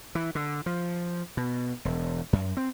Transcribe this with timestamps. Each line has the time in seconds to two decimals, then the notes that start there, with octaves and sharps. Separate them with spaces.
0.15 E3
0.35 D3
0.66 F3
1.37 B2
1.85 E1
2.33 F#2
2.57 C4